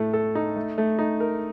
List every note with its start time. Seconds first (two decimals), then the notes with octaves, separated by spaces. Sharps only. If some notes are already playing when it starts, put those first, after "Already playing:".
Already playing: A2 A3 A4
0.13 A4
0.35 D#4
0.56 A3
0.78 A3
0.99 D#4
1.20 A#4